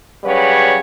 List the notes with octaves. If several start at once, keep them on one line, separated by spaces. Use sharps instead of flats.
C#3 F#3 G3 B4 C#5